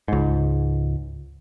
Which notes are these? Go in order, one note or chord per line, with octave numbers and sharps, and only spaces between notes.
C#2 G#2